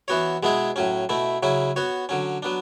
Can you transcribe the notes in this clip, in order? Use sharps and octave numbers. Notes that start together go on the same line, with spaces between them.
E3 B3 F#4 C#5
B2 G#3 B3 E4 G#4
A2 F#3 C#4
B2 A3 E4
C#3 F#3 C#4 E4
B3 F#4 C#5
D3 F#3 C#4
F#3 B3 D4